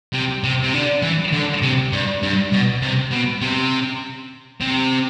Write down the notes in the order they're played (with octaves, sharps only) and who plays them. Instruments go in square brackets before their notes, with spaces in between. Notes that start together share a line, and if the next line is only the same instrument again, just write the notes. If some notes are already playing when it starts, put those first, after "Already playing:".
[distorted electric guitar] C3
C3
C3
D3
E3
D3
C3
G2
G2
B2
C3
B2
C3
C3